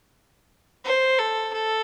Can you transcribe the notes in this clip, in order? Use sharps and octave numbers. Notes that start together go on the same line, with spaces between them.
C5
A4
A4